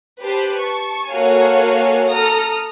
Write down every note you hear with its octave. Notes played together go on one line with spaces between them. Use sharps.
G4 B4 C5 A5
A5 C#6
A#3 F#4 A4 C#5 F5 G#5
A4 A#5 D#6 F6